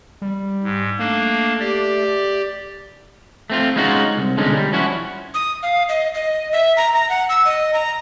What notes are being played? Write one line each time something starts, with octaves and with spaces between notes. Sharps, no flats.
G3
G#2
A3 A#3 D4
G4 D5
A3 C4 F4
G#3 C#4 D#4 F4 F#4
C2
B1 D3 G#3 C#4 D#4
G3
F3 C#4 E4 F#4
D#6
F5
D#5
D#5
E5
A#5
A#5
F#5
E6
D#5
A#5